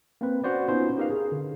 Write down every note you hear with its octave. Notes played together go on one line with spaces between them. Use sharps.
A#3 C4 B4
C#4 F#4 B4 C5 D5
B3 C#4 D#4 F4 C5
D#4 G4 A#4 B4 F5
G#4
D3